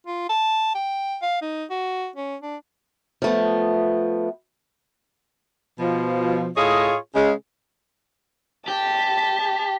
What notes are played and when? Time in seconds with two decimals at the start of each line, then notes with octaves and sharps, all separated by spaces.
0.07 F4
0.29 A5
0.75 G5
1.22 F5
1.42 D#4
1.70 F#4
2.16 C#4
2.42 D4
3.22 F3 A3 B3
5.79 B2 F3
6.57 A2 F4 G#4 C#5 D#5
7.15 C#3 G#3
8.68 G4 A5